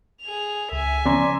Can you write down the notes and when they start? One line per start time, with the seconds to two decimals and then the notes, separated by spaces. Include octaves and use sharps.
0.22 G#4 F7
0.72 C#2 E5 G#5
1.06 C#3 E3 F3 B3 C#4 D5 A#5 C6